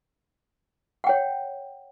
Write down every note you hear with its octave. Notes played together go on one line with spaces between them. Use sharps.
C#5 F#5 G5